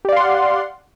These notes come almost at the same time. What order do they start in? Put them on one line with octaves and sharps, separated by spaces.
G4 D5 F5 C6 F#5